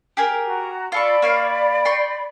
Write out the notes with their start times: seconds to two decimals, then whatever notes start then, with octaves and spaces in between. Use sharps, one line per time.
0.17 G4 G#4 A#4
0.46 F#4 A#5
0.92 F4 A4 D5 B5 C#6
1.22 A#3 C#5 F5
1.85 G5 C6 C#6